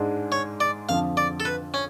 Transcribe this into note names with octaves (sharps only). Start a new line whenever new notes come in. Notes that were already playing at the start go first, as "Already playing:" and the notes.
Already playing: G#2 G#3 D4 G#4
C#5
D5
F2 D3 F3 F5
D5
A4
B4
C#4